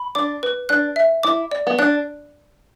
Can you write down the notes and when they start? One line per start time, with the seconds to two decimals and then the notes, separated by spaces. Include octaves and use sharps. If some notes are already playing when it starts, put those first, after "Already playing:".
Already playing: B5
0.15 D4 D6
0.43 B4
0.69 D4 F#6
0.96 E5
1.23 E4 D6
1.51 D5
1.67 B3
1.79 D4 F#6